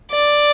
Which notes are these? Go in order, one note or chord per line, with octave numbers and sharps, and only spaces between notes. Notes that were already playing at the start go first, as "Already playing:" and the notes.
D5